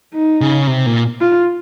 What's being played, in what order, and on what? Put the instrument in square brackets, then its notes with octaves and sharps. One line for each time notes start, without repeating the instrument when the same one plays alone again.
[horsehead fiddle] D#4
[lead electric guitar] C#3
C3
A#2
[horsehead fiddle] F4